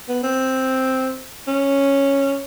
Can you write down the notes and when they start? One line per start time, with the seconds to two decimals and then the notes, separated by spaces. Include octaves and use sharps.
0.09 B3
0.23 C4
1.48 C#4